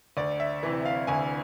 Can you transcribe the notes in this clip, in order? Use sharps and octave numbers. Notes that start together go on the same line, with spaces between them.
D2 D5
E5
C3 E3
F5
D2 G#5